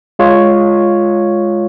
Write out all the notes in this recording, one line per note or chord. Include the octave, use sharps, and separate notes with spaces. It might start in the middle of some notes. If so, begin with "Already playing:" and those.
G#3 F4 C#5